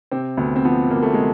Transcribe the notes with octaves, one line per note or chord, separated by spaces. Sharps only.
C3 C4
D2 B3
C4
F3 B3
D2 A#3
A3
C3 G#3